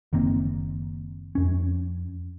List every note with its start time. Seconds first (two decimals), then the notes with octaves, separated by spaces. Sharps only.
0.13 F#1 D#3 A#3 C4
1.35 F2 C#4